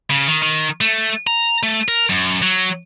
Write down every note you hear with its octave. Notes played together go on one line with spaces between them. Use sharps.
C#3
D#3
D#3
A3
A#5
A3
A#4
F#2
F#3